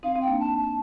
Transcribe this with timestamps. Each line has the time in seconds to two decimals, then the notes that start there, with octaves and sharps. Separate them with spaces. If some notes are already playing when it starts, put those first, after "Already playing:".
0.03 C4 D#4 F5
0.15 C4 D#4
0.21 G5
0.28 A#3 D4
0.40 A5
0.58 A5